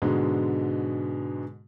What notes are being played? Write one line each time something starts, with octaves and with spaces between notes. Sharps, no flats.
G#2 B2 D3 G#3